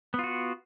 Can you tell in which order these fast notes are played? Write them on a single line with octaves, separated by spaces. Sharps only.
B3 F4 F#4